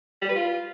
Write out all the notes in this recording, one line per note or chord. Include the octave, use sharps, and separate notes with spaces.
G3
B4
F4